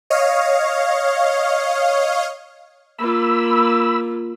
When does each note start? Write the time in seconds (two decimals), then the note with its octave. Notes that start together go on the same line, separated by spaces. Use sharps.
0.10 C#5 D#5 F5
2.99 A#3 F4 B5 E6